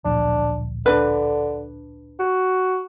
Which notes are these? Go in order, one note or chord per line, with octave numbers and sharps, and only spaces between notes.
D1 A#1 D4
D3 D4 B4
F#4